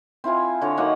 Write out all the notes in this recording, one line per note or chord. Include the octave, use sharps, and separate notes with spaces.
C4 E4 F4 G#5
D3 C#5 A#5
F#3 A#3 D#4 F#5